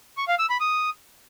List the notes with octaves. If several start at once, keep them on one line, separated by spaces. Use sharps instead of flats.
C#6
F5
E6
B5
D#6